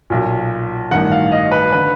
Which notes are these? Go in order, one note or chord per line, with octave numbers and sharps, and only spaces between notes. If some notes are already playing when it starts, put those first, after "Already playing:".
B1 A#2
A1 G2 D#3 F#5
F5
D#5
B4
D3 B4